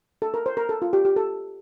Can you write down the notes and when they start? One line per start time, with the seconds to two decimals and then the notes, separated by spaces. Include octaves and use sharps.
0.22 A4
0.34 A#4
0.46 C5
0.57 A#4
0.69 A4
0.82 F4
0.93 G4
1.05 G4
1.16 A4